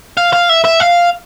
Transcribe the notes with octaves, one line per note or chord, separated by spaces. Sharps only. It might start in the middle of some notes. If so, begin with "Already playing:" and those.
F5
F5
E5
E5
F5